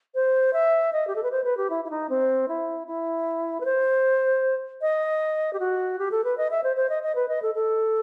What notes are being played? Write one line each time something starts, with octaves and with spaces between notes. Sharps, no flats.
C5
E5
D#5
G4
A4
B4
C5
B4
G4
E4
E4
D#4
C4
E4
E4
B4
C5
D#5
G4
F#4
G4
A4
B4
D#5
E5
C5
C5
D#5
D#5
B4
D#5
A4
A4